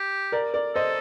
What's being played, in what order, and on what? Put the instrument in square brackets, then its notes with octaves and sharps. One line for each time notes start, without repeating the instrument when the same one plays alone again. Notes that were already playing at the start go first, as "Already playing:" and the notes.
Already playing: [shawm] G4
[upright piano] A#4 D5
A#4 D5
[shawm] A4 [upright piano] C5 D#5